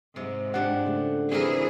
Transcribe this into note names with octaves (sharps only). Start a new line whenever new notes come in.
G#2 C3
F3 D4 G4 F#5
C#3 A3
E3 G3 C4 G#4 A#4